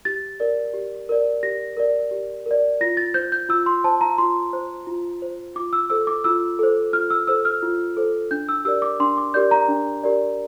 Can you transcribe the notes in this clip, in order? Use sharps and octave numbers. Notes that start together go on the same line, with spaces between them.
G4 A6
A#4 D5
G4
A#4 D5
G4 A#6
A#4 D5
G4
A#4 D5
F4 A#6
A6
C5 G6
G6
F4 E6
C6
C5 A5
A#5
F4 C6
C5
F4
C5
F4 D6
E6
A4 C5 E6
D6
F4 E6
A4 C5
F4 F6
E6
A4 C5 E6
F6
F4
A4 C5
D4 G6
E6
G4 A#4 D5 E6
D6
D4 C6
D6
G4 A#4 D5 G6
A#5
D4
G4 A#4 D5